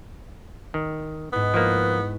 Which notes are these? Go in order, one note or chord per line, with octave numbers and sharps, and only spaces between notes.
D#3
G#2 B3 E4
F3 A#3 B4 C#6 F#6